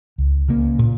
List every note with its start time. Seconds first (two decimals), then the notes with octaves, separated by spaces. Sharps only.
0.18 C#2
0.48 C#3 A#3
0.79 A#2